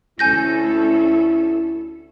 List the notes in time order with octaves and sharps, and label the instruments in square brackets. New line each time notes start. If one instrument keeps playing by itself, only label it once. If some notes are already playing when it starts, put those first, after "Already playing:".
[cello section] D2 C#4 A4 [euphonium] E4 [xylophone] G#5 G6 A#6